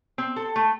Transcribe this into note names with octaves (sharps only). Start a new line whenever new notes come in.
C4
A4
A3